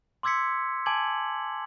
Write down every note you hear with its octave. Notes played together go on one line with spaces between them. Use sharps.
C6 D6 E6 G#6 B6 C#7
G#5 A5 D6 G#6 F#7